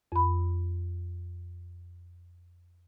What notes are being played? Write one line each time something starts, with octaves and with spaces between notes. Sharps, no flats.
F2 B5